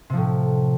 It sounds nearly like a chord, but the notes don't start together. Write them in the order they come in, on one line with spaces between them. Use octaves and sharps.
C3 F3 A2